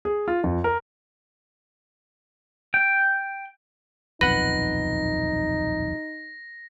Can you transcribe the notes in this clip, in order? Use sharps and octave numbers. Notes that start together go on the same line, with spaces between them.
G#4
F4
F2
A#4
G5
D#1 B1 F2 D#4 B4 F#5 A#6